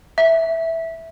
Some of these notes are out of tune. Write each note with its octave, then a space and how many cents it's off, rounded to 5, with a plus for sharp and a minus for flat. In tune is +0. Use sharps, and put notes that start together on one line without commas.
E5 -5